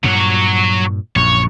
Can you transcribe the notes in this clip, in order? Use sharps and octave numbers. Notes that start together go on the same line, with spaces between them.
G2 A#2 F#3 C#5
A#1 F#2 A#2 C#5